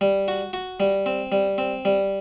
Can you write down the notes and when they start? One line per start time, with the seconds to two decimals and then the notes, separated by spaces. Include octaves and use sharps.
0.01 G3
0.28 F#4
0.53 F#4
0.80 G3
1.06 C4
1.32 G3
1.58 C4
1.85 G3